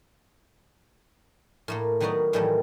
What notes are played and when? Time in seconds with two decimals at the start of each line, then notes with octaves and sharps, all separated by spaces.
1.68 A2 A3 A#3
2.00 D#3 F#3 B3 D#4 F#4 D5
2.33 A2 D#3 E3 F#3 G3 A3